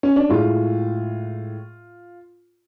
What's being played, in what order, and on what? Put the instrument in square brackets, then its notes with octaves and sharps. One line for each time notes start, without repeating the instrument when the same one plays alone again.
[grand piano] C#4
D4
A2 G#3 F4